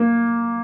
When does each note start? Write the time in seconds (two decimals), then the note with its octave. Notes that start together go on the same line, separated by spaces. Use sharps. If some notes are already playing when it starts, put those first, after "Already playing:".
Already playing: A#3